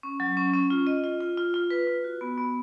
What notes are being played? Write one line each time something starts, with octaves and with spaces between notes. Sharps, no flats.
C#4
F#3
C#4
C#4
F4
D#5
F4
F4
F4
F4
B4
F4
F#4
B3
B3